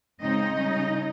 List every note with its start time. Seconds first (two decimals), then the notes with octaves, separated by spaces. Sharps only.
0.22 C#3 G#3 C4 D#4 D#5
0.58 C#3 G3 C#4